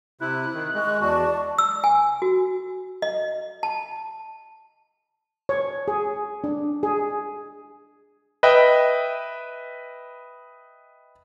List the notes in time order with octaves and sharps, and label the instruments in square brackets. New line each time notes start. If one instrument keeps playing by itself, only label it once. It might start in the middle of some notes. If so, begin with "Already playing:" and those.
[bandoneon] C3 E4 [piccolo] F#6
[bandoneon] D#3
[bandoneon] G#3 [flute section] C#6
[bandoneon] E2 F#4 [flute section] D5 A5 C#6
[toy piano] E6
G#5
F#4
D#5
A5
[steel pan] C#5
G#4
D4
G#4
[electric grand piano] B4 D#5 E5 G5